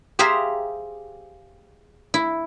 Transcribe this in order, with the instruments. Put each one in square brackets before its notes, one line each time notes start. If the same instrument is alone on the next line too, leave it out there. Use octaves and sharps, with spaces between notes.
[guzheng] G4 G#4 C5 E5 F5 A#5
E4